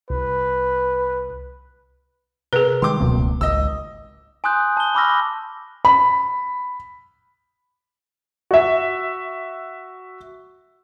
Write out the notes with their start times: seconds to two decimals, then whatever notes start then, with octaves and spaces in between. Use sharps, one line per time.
0.10 C2 B4
2.53 C3 G#4 A#4 B4
2.82 D#3 G3 G#3 G5 C6 D6
3.00 D1 C#2 B2 F#3 A#3 C4
3.41 G#1 C#2 D#5 E6
4.44 G#5 C6 D#6 F#6 G6
4.77 A5 G7
4.95 B5 C#6 D6 E6 F6 A#6
5.85 B5
8.51 F#4 E5